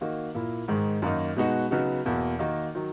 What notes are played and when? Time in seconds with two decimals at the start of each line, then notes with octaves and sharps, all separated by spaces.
0.01 D#3 A#3 D#4 F#4
0.35 A#2 A#3 E4
0.68 G#2 D#3 G#3
1.02 F#2 D#3 A#3 D#4
1.37 B2 G#3 B3 D#4 F#4
1.71 C#3 F#3 B3 D#4 F#4
2.05 E2 B2 A#3 E4
2.39 D#3 A#3 D#4 F#4
2.75 D#3 F#3